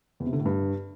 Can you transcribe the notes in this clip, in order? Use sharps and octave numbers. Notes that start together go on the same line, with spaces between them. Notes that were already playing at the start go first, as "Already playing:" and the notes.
E2
C3
D3
A2
G2